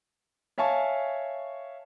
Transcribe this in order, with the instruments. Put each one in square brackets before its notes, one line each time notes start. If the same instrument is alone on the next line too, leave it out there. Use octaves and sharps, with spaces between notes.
[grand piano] C#5 E5 F5 G#5 A5 C#6